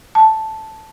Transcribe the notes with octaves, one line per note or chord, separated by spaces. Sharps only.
A5